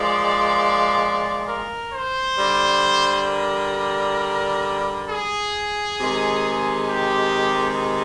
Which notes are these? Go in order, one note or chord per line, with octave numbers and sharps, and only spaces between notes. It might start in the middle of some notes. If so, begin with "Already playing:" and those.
Already playing: A#2 F3 G#3 D5
A#4
C5
D3 G3
A#4
G#4
C3 D#3 G#3
G4